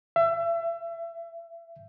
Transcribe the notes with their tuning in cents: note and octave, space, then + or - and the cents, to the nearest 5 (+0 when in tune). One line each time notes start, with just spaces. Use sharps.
E5 +30